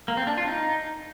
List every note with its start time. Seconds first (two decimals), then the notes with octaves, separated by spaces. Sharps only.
0.08 A#3
0.17 C4
0.27 D4
0.38 F4
0.48 D#4